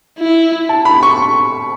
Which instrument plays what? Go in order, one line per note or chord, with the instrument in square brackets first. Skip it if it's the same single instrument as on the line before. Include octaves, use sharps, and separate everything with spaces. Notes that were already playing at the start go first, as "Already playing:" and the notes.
[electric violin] E4
[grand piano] A5
B5
C#6